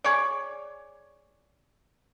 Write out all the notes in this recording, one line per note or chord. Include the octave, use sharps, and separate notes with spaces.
G#4 C#5 D5